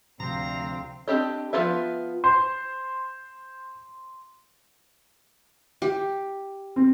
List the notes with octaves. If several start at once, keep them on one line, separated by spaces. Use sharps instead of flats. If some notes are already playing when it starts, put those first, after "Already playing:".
D2 C3 F3 C4 F5 G5 A#5
C4 D4 G4 D#5
F3 B3 F4 B4 E5
C5 C6
G4
C4